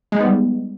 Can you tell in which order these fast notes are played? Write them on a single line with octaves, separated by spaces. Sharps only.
G#3 D#4 B3 G3